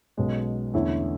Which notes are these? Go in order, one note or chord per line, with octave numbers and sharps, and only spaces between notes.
B1 B2 G#3 C#4
E2 D3 A3 C#4 E4